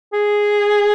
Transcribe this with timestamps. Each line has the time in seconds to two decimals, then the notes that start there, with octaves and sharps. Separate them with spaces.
0.13 G#4